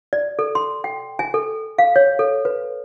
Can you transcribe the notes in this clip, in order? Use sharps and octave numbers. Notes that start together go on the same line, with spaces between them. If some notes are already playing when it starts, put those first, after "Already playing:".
D5
A4
C6
G5
G#5
A4
F5
C#5
A4
B4